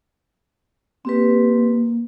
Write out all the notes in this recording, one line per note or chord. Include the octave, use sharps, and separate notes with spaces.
A#3 C4 G4 B4